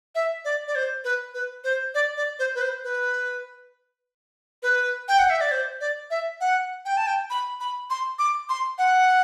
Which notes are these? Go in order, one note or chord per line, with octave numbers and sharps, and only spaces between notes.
E5
D5
D5
C5
B4
B4
C5
D5
D5
C5
B4
C5
B4
B4
G5
F#5
E5
D5
C5
D5
E5
F#5
G5
A5
G5
B5
B5
C6
D6
C6
F#5